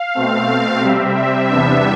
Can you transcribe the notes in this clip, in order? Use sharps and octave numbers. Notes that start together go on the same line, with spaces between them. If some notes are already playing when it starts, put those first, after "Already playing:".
Already playing: F5
B2 A3 C4
C3 G3 C4 E5
E5
E2 C3 G3 B3 D4 E5